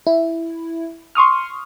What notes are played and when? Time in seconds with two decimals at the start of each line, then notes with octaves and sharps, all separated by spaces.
0.07 E4
1.15 C6 C#6 D#6 F6